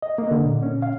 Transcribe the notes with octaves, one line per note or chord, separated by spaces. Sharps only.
D#5
A#3
D3
A#2
C#4
F5